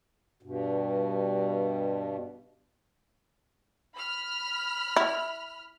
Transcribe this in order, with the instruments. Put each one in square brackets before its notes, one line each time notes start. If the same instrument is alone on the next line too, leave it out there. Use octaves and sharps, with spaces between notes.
[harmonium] G2 B2
[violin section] B5 F6
[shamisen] E4